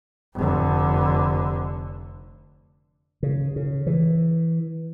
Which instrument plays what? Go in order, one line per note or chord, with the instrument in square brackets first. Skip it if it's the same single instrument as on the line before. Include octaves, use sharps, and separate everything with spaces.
[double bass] F1 D3
[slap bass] C#3
C#3
E3